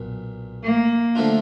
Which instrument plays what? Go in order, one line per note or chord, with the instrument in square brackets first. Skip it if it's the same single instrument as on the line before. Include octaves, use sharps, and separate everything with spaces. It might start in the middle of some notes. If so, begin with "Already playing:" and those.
Already playing: [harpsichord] B1 A#2
[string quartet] A#3
[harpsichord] D3 F3 A3 D4 F4